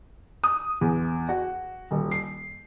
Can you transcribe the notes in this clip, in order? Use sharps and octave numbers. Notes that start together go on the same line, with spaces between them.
D#6
E2
F#4
D#1
C7